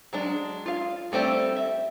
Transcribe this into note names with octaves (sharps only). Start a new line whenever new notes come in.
F#3 G#3 D4
F4 F5
G3 A3 C4 G4 D5
E5